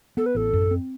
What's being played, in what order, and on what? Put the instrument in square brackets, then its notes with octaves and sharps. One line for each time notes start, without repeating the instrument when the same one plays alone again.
[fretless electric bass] B3 [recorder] A4
[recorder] B4
[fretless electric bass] A1 [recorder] A4
[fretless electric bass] F#2
C4